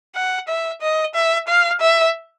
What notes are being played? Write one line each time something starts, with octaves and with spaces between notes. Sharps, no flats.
F#5
E5
D#5
E5
F5
E5